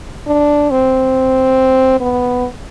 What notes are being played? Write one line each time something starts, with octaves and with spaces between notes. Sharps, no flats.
D4
C4
B3